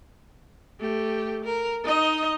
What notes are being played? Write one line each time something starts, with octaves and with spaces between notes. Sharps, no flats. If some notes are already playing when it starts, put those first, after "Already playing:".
A3 G4
A#4
D#4 D#5